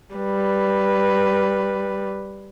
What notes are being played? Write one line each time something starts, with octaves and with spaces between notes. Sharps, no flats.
G3 B4